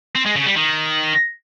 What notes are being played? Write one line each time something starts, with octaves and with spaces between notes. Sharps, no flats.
C4
G#3
C#3
G3
D#3